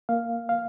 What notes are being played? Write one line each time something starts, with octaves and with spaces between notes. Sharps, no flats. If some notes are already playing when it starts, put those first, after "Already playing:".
A#3 F5
F5